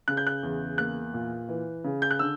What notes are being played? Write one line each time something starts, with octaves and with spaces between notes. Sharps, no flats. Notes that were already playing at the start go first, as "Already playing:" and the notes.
C#3 F#6
G6
F#6
E2
A#3 F#6
A#2
E3
C#3
G6
F#6
D3 E6